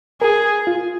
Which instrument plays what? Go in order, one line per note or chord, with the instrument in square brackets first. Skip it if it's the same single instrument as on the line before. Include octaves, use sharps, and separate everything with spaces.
[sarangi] G#4 [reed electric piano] A#4
[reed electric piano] F4